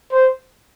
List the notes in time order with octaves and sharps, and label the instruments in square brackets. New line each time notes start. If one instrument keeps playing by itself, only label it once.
[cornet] C5